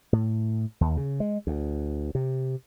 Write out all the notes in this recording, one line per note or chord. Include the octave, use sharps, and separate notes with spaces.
A2
D#2
C#3
G#3
D2
C3